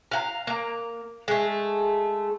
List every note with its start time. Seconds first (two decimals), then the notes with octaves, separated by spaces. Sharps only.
0.11 F5 F#5 A#5
0.47 A#3 A#5
1.28 G#3 A3